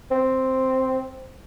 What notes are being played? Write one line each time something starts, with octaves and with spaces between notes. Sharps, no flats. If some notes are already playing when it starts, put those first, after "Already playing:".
C4